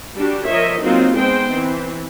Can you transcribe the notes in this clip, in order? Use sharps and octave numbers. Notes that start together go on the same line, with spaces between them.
G3 D4 F#4 G4
F3 A#4 C#5 D#5 E5
F#3 A#3 C4 D#4 F4 F#4
G#3 B3 C4 D#4 C5 G5
E3 C4